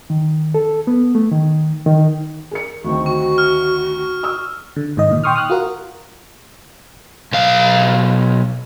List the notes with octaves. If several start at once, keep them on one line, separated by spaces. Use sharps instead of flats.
D#3
A4
B3
A3
D#3
D#3
G#4 A#4 C#7
D2 D#3 C4 C#6
F#4 C#6
F6
D#6 E6
D3
G#2 D#3 D#5
A#2 D#3
G5 C6 C#6 D#6 F6
D#6 F6 F#6
F4 F#4 A#4 F5
B1 F5